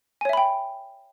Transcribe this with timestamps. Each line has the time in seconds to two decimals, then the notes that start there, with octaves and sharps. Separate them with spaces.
0.21 G#5
0.25 C#5
0.29 E5
0.33 B5
0.37 G5